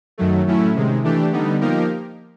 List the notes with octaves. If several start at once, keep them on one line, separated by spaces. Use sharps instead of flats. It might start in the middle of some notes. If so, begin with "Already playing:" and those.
F#2 D#3 F#3 A3
A2 F#3 A3 C#4 E4
C3 D#3 G#3
E3 A3 D4 G4
D3 G3 B3 D#4
F3 A#3 D#4 G4 A#4